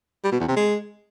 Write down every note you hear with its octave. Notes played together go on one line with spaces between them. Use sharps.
G3
B2
E2
C3
G#3